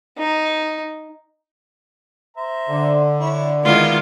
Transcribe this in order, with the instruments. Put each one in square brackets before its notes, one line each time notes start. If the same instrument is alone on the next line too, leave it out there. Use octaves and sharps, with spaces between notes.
[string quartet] D#4
[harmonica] C5 E5 A#5
[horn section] D3
[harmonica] E4 C#5
[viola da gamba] D#3 G#3 E4 [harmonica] B3 D5 [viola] F4